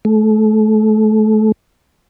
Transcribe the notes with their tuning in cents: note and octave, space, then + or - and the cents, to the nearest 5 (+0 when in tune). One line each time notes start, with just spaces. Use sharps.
A3 -30